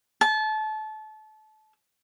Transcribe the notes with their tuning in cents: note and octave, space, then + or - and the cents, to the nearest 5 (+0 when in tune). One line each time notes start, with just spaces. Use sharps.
A5 -30